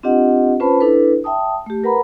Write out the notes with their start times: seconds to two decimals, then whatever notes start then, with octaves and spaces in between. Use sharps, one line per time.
0.03 C4 D4 F4 G4 D#5 F#5
0.60 C#4 F4 B4 C5 A5 B5
0.81 D4 E4 A4 B4
1.24 E5 G5 A5 D#6
1.66 A3 G4
1.84 A#4 B4 F#5 A#5 B5